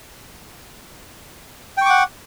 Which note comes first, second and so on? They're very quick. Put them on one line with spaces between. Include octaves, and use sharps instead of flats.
G5 C#6 D6 F#5